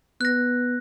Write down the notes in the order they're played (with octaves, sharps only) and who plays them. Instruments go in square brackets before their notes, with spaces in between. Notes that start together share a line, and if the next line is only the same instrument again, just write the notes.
[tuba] B3 [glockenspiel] F#6 A#6